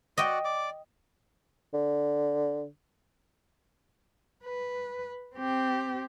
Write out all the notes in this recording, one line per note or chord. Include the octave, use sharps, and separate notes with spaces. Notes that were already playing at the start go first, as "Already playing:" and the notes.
F#4 D5 D#5 G5
D5 D6
D3
B4
C4 G4